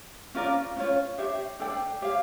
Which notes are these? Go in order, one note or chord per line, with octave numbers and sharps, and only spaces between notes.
C#4 F4 A#4 D5
C#4 F4 C#5
D4 G4 C#5 E5
D4 A4 D5 G5
G4 C#5 F5